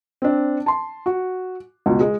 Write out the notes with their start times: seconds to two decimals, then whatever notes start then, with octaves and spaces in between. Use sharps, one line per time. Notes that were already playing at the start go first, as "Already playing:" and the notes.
0.22 C4 D4
0.66 A5 C6
1.06 F#4
1.86 C#2 B2
2.01 G#3